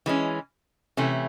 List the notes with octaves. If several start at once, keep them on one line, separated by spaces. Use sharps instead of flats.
E3 G#3 C#4
C3 E3 A3 C#4 E4